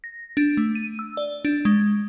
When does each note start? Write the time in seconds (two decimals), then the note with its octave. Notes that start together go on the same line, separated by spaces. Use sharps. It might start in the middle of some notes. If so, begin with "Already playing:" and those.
0.04 A#6
0.37 D4
0.57 A3
0.75 D#7
0.99 E6
1.17 D5
1.45 D4
1.65 G#3